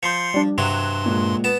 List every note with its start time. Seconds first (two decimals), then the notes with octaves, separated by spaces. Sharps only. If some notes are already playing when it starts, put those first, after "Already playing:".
0.03 F3 C6 G6 C7 C#7
0.34 G3 D4
0.58 G2 C3 F#3 C6 F#6 E7
1.06 A#2 G#3
1.44 B3 A5